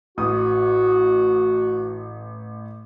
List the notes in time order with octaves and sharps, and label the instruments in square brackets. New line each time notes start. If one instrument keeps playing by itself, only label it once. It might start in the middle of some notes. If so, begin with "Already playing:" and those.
[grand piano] A1 D#6 [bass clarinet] F#4